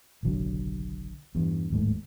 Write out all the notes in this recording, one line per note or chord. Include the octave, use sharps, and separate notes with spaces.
F#1 B1 D3 F#3
E2 G2
D1 D#2 G#2 A3